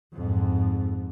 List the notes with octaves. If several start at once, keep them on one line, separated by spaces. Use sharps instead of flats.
F2 G#2